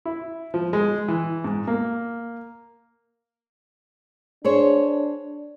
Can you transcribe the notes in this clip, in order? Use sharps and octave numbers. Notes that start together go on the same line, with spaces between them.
E4
F3
G#3
E3
G#2
A#3
D4 G#4 C5 C#5